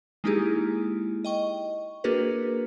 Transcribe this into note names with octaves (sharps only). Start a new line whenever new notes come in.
G#3 A#3 D#4 E4 G4 G#4
D#5 G5 C#6
A#3 D4 F#4 G#4 A#4 B4